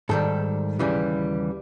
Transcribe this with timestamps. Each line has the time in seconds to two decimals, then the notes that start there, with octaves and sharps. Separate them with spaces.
0.09 G#2 D#3 G3 A4
0.79 D#2 C#3 E3 G3